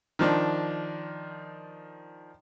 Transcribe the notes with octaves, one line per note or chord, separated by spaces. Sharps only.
D#3 F3 D4